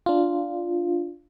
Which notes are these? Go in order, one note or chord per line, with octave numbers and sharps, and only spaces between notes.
D4 F4